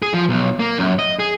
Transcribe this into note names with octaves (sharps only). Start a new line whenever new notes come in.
G#4
F3
B1
A#3
F#2
D#5
G#4